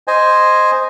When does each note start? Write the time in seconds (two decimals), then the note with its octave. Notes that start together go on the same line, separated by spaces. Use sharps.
0.08 C5 D#5 G#5